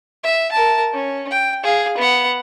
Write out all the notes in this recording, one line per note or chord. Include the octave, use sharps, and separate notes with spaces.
E5
A#4 A5
C#4
G5
G#4 F5
B3 F#5